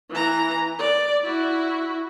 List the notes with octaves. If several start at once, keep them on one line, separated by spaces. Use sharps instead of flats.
E3 A#5
D5
E4 F#4